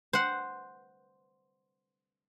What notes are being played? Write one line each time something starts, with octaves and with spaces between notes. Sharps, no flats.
C5 F#5